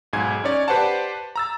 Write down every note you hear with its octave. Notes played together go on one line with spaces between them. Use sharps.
B1 G#2 G#5 G#6
C#4 D#4 C#5 D5
G4 B4 C5 D5 F#5 A5
A#5 E6 A6